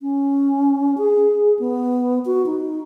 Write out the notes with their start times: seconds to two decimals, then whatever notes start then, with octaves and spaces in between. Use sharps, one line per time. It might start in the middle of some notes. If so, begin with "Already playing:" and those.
0.02 C#4
0.98 G#4
1.59 B3
2.25 F#4
2.46 D#4